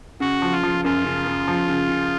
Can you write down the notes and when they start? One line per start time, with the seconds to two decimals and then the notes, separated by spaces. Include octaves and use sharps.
0.20 C#3 F#4
0.42 F3
0.52 F4
0.63 F3
0.84 F#2 F4
1.05 C#3
1.26 C#3
1.48 F3
1.68 C#3
1.89 C#3